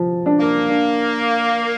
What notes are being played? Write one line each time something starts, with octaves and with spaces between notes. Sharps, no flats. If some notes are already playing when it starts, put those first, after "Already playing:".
Already playing: F3
D4
A#3
D4